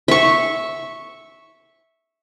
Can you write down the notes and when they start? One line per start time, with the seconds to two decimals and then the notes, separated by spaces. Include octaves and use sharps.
0.08 E5 C#6